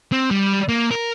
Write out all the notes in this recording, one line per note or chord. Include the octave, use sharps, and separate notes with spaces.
C4
G3
A#3
A#4